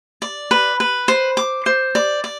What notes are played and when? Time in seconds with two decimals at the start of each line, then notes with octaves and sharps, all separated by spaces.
0.22 D5
0.51 B4
0.80 B4
1.08 C5
1.37 D6
1.66 C5
1.95 D5
2.24 D5